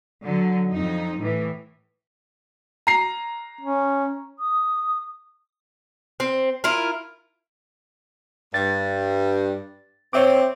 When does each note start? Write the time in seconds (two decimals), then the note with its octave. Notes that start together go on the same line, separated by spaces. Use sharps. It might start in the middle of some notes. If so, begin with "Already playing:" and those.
0.23 D3 F#3
0.70 F2 D#4
1.19 A2 E3
2.87 A#5 C7
3.61 C#4
4.39 D#6
6.20 C4
6.64 E4 F4 A#4
8.54 G2 A6
10.13 C4 C#5 E5 D6